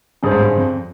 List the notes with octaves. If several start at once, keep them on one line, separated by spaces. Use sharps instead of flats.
G2 C#4 G#4 C5
G#2
G2
F2